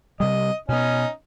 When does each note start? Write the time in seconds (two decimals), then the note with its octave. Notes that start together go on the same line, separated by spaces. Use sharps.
0.20 C3 G3 D#5
0.68 B2 B3 C#4 D#4